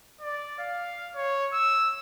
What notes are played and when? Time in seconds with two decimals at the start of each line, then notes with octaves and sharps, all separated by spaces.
0.21 D5
0.59 F5
1.15 C#5
1.52 E6